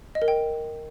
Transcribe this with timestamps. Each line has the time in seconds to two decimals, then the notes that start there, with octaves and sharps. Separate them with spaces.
0.15 D#5
0.22 A#4
0.28 G5